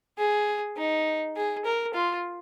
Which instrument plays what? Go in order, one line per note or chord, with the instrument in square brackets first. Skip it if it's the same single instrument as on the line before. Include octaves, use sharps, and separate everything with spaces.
[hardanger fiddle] G#4
D#4
G#4
A#4
F4